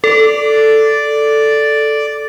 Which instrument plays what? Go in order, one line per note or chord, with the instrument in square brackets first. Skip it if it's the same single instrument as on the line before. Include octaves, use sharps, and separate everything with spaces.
[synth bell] A4 [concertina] D5